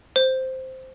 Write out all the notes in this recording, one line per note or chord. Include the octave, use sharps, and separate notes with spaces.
C5